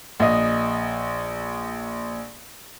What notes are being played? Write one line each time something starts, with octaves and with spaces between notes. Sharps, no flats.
A#1 D#5